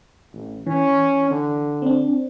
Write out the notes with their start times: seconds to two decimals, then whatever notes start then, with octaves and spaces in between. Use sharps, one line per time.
0.33 A1
0.67 E3 C#4
1.31 D3
1.82 C4 D4